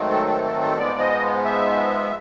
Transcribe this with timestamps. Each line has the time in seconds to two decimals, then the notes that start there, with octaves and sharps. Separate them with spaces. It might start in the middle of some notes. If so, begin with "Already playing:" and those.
Already playing: G#2 D#3 F#3 A3 C4
0.10 A4
0.27 A4
0.44 A4
0.61 A4
0.77 G#2 F3 G#3 B3 D5
0.99 D#5
1.45 E5